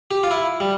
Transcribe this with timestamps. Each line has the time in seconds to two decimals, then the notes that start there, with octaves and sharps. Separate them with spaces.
0.11 G4
0.23 F4
0.31 E4
0.60 G3